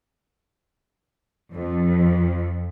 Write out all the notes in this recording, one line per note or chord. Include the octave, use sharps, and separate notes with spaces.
F2